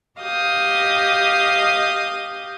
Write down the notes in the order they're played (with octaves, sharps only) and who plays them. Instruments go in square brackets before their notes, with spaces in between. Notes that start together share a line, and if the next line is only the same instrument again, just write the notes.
[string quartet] G4 D#5 F5 D#6 G6